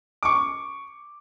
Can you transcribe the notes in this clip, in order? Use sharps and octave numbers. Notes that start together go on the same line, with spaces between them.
C#6 D6